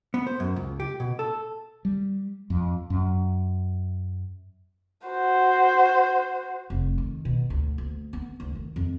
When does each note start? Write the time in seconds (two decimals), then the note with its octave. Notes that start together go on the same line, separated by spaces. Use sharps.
0.14 B3
0.27 C5
0.40 F#2
0.56 C#2
0.80 G4
1.00 B2
1.19 A4
1.85 G3
2.50 F2
2.90 F#2
5.08 F#4 C5
6.70 F1
6.98 D#3
7.25 B2
7.50 D2
7.78 D2
8.13 B3
8.40 D2
8.55 D#3
8.76 F2